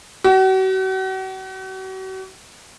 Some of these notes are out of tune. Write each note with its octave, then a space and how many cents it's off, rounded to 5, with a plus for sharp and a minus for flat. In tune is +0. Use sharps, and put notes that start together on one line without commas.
F#4 +40